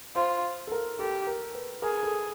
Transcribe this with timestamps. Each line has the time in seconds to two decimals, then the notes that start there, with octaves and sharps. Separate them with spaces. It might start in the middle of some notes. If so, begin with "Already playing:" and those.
0.15 F4 C5
0.67 A4
0.72 A#4
0.99 G4 A4
1.27 A#4
1.55 B4
1.82 G#4 A#4
2.03 A4